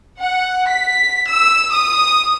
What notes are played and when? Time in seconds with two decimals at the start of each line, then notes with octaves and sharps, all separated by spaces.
0.20 F#5
0.69 B6
1.29 E6
1.72 D#6